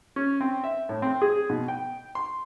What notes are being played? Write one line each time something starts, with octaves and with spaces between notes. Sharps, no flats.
C#4
C4
E5
A2
C4
G#4
B2
G5
C6